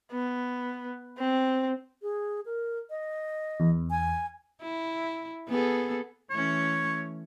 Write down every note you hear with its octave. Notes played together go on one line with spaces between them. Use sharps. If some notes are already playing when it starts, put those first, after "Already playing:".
B3
C4
G#4
A#4
D#5
E2
G#5
E4
B3 G#4 A4
E3 A3 C#4 C#5